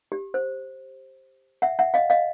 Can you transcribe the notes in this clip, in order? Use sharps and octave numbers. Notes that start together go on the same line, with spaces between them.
G4
C5
E5 F#5
E5 F#5
D#5 F5
D#5 F5